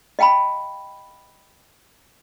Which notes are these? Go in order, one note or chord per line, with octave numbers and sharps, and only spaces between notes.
D#5 F5 G5 A5 B5